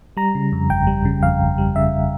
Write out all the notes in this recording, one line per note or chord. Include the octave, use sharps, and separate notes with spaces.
G3 A#5
C#3
F2
G1 G5
G3
C#3
F2 F5
G1
G3
C#3 E5